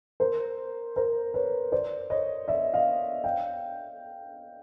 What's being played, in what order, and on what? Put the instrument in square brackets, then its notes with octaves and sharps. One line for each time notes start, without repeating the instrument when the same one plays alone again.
[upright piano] A#4 C5
A#4 C5
B4 C#5
C5 D5
C#5 D#5
D5 E5
D#5 F5
F5 G5